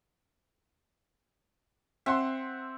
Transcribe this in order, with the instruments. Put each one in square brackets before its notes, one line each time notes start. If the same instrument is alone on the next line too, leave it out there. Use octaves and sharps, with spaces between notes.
[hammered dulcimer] C4 [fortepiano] E5 F#5 C6